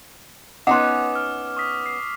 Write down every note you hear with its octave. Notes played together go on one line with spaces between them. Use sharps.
B3 C#4 D#4 F#5 C6 D6
F6
C#6 D#6 B6
C7